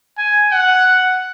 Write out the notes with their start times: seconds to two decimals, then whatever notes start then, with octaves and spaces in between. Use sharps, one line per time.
0.18 G#5
0.52 F#5